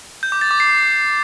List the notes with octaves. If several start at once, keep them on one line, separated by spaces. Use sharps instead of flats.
G6
D6
A6
D6
C7